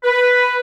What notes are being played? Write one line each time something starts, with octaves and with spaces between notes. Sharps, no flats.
B4